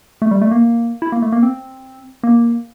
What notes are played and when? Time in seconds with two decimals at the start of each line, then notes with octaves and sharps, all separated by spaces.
0.22 A3
0.31 G3
0.41 A3
0.51 A#3
1.02 E4
1.12 A#3
1.22 A3
1.32 A#3
1.43 C4
2.23 A#3